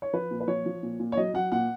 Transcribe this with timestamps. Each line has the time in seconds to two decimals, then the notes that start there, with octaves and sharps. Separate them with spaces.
0.02 C#5
0.13 F3 B4
0.31 A#2
0.40 B4
0.48 F3 C#5
0.66 F3
0.83 A#2
0.99 A#2
1.12 C#5
1.17 F#3 D#5
1.34 F#3 F#5
1.52 A#2 F#5